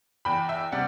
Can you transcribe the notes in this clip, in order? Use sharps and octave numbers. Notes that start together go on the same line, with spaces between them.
E2 G5 B5
E5 G5
C3 G3 D5 F#5